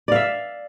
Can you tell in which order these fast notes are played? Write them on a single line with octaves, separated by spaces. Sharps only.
D5 F5 E5